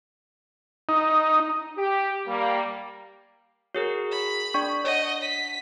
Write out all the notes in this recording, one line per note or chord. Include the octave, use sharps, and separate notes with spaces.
D#4
G4
G3 A#3
F#4 G#4 A#4 C#5
B5
D4 D5 G5 C#6
C#5 D#5 F#5
B6